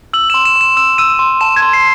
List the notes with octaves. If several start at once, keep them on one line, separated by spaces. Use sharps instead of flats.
E6 F#7
C6 E7
E7
C6 E7
E6 E7
E6 D#7
C6
A5 E7
G#6
C6
C7